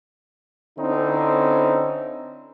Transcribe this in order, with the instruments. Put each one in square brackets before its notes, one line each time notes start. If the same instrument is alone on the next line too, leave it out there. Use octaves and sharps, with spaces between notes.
[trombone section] D3 C4 C#4 D#4 E4